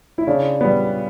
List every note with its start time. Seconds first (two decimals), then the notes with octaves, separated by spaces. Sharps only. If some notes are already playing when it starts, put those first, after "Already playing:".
0.18 E4
0.27 C#3 D4
0.61 G3 B3